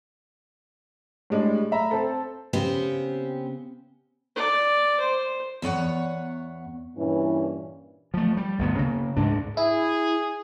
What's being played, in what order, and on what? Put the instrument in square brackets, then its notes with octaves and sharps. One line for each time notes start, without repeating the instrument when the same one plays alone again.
[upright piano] A2 G3 G#3 D4
A3 E5 A#5 B5
C4 A4
[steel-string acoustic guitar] C#3 B3 C4 G4 C5
[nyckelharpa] D5
C5
[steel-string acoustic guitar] E2 B3 C#5 F#5
[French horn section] G2 A#2 E3 C#4
[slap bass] F3 A3
G3
G1 D2 B3
C#3 A#3
D2 G#2 G#3 D4
[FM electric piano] E4 [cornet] G#4